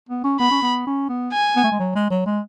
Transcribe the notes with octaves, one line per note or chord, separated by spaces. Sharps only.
B3
C#4
B3 B5
C#4
B3
C#4
B3
G#5
B3
A3
G#3
F#3
G#3
F#3
G#3